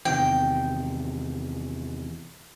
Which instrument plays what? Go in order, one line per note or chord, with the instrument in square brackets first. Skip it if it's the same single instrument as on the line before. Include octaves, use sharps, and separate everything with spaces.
[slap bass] E2 C3 D#3 [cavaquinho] G5